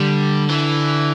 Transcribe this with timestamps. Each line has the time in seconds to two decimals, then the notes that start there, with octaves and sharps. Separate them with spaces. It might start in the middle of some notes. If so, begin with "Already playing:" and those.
Already playing: D3 G3
0.50 E3